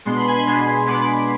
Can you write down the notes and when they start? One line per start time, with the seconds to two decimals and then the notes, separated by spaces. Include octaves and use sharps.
0.05 B2 G#3 B3 D4 C6
0.17 B5
0.26 G#5 C6
0.47 B2 G#3 B3 D4
0.87 B2 G#3 B3 D4 B5 D6